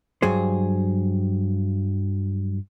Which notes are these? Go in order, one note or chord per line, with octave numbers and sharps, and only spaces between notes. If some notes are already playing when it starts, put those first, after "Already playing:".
G2 F#3 G#4 C5